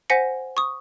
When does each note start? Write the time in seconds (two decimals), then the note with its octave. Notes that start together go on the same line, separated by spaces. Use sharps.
0.10 C5 F#5 G#5 A#6 B6 C#7
0.57 C#6 D#6